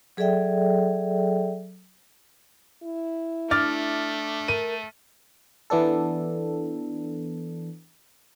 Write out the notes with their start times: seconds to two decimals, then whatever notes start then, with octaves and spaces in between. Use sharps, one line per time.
0.17 F#3 G#4 A4 D5 E5 G5
2.83 E4
3.51 A3 D4 D6 F6 A6
4.48 A#4 D#7
5.70 E3 B3 D4 A4